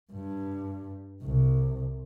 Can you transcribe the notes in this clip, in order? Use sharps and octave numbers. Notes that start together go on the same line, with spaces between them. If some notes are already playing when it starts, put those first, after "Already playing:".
G2
C2